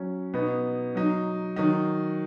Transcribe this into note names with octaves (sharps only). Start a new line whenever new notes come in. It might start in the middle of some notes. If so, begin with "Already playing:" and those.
Already playing: F#3 C#4
B2 B3 D#4
F#3 D#4
D#3 F#3 D#4